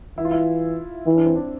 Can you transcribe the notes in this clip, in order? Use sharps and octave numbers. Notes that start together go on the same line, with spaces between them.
E3 E4
F4
E4
E3 E4
D4
C4
D4